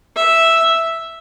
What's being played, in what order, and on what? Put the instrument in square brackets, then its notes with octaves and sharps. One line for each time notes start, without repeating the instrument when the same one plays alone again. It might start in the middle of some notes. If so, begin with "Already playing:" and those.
[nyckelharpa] E5